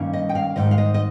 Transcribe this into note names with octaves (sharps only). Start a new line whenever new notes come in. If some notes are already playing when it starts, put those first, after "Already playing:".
Already playing: G2 D#3 G3 A#3 C#4
D#5
G5
F5
G#2 D#3 G3 D#5
F5
D#5
D#5